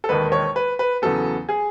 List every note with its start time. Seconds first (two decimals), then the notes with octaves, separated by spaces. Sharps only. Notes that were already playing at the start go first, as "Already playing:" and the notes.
0.04 A4
0.09 E1 D#2 D#3 B4
0.32 C#5
0.56 B4
0.79 B4
1.02 E2 C#3 F#3 B3 A4
1.49 G#4